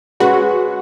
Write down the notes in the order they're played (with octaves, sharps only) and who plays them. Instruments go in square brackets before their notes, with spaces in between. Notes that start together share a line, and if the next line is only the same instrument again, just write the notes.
[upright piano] G#3 C#4 G#4 B4 [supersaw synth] F#4